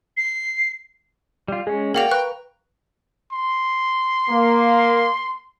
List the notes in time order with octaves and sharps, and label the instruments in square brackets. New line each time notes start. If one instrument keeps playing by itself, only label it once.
[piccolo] C7
[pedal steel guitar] G3 F4
[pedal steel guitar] G#3 C#4 [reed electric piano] G#4
[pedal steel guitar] A#3 F#4 D5 [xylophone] A#4 F5 F7 [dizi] G5
[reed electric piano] B4 [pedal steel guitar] A#5 C#6 [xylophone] F#6
[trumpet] C6
[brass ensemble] A#3